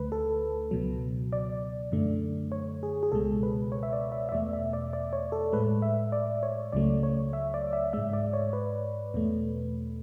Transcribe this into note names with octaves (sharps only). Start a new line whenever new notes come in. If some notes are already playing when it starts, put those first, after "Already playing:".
Already playing: D2 D3 A3 B4
A4
C#2 B2 F#3
D5
F#2 D3 A3
C#5
G#4
G#4
C#2 B2 G#3 A4
B4
C#5
E5
D5
E5
E5
E2 B2 A3 D5
E5
D5
D5
C#5
A4
A2 G#3 B4
E5
D5
C#5
C#2 C#3 F#3 A3 D5
C#5
E5
D5
E5
G#2 G#3 E5
D5
C#5
B4
E2 B2 A3